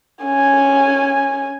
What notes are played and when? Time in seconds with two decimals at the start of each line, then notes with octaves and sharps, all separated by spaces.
0.24 C#4 G#5